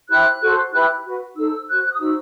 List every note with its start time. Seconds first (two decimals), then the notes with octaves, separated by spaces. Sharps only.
0.09 E4 G4 C5 F#6
0.40 F#4 A4 C5
0.72 E4 G4 B4 F#6
1.04 F#4 B4
1.36 D#4 A4 C5 E6
1.68 F#4 C5 F#6
1.83 F#6
1.91 D#6
1.99 D#4 F#4 C5 E6